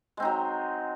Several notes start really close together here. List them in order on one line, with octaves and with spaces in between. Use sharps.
G#3 C4 D#4 F#3